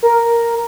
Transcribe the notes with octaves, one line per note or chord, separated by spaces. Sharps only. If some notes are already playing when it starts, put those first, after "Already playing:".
A#4